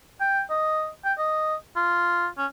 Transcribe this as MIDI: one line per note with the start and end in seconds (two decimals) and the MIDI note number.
0.21 0.42 79
0.50 0.89 75
1.05 1.13 79
1.18 1.55 75
1.76 2.27 65
2.38 2.46 61